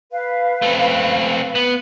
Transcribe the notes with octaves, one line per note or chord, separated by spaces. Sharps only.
B4 F5
A3 C4
B3